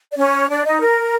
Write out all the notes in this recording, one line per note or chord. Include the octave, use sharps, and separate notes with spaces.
D5
C#4 C#5
D4 D5
D#4 D#5
A#4